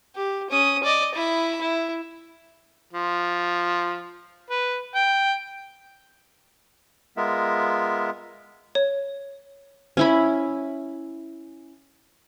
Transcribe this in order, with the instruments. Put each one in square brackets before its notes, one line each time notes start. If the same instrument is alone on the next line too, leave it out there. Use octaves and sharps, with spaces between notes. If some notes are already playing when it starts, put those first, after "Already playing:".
[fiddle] G4
C#4 D#6
D5 D#5
E4 B5
E4
[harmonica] F3
B4
G5
[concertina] G#3 B3 F4 A#4 E5
[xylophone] C#5
[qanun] C#4 E4 B5